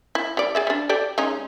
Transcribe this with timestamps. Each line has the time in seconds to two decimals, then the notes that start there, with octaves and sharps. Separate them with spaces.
0.15 E4
0.37 G3 D5
0.55 G#4 D5 E5
0.67 G3 D4
0.89 G4 A4 D5
1.18 G#3 C#4 D#4